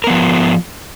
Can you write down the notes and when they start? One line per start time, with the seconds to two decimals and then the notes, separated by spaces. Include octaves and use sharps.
0.04 A#4
0.07 B3
0.10 F3